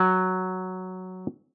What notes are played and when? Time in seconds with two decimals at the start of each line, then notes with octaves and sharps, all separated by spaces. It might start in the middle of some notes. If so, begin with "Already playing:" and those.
Already playing: F#3